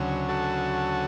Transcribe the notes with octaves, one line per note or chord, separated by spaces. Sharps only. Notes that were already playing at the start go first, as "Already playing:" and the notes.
Already playing: D2 C#3 F#3
F#4 A4